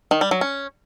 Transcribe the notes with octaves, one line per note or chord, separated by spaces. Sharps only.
D#3
G3
F#3
C#4